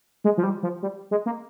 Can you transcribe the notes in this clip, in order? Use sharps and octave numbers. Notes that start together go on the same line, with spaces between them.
G#3
F3
G3
F3
G3
G#3
A#3